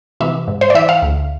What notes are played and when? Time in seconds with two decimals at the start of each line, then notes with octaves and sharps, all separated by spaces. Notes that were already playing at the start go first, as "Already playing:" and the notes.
0.20 C3 E3 E5
0.48 G#2
0.61 C5
0.70 D5
0.75 E3 E5
0.89 F5
1.02 D2